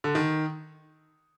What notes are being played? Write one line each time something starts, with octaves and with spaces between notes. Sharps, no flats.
D3
D#3